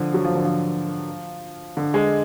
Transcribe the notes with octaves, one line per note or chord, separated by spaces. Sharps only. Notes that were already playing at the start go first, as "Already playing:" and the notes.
Already playing: D3 F3
F#3
F3
D3
F3
D3
G#3